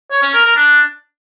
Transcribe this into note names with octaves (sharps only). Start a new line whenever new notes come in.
C#5
C#4
A#4
A#4
D4